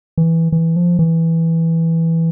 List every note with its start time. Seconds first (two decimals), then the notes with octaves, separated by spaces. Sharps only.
0.18 E3
0.52 E3
0.76 F3
0.99 E3